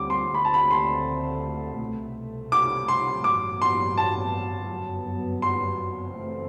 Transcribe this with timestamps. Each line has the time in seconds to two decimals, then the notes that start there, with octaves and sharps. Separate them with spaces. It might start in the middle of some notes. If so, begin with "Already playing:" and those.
Already playing: D2 D3 G3 C4 D6
0.10 C6
0.34 D2 D3 A3 C4 B5
0.45 A5
0.54 B5
0.71 C6
1.80 C2 B2 A3
2.52 D6
2.88 C6
3.24 A1 G2 F#3 B3 D6
3.62 C6
3.98 A5
4.70 G1 F#2 F#3 B3
5.42 C6
6.15 F#1 F#2 E3 A3 C4